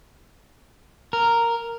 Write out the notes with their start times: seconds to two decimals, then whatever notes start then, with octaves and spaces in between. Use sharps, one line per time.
1.13 A#4